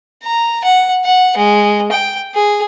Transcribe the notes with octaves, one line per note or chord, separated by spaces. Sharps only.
A#5
F#5
F#5
G#3
G5
G#4